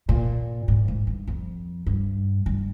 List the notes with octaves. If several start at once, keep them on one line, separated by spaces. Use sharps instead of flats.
A#2
G#2
G#2
G2
F2
G2
G2